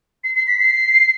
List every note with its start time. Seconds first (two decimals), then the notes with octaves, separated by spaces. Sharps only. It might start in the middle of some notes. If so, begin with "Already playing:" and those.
0.24 C7
0.35 C7
0.47 B6
0.60 C7